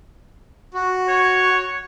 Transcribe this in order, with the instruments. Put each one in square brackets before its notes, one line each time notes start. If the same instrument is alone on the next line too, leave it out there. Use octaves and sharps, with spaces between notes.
[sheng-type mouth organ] F#4
[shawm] C#5